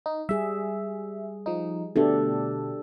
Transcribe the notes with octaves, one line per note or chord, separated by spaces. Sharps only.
D#4
G3 G#4 E5
F3 D#4
B2 D3 A3 D4 G4 A4